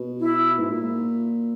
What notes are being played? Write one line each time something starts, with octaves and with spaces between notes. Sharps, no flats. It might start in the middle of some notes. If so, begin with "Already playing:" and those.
Already playing: B2
E4
G#2
A#2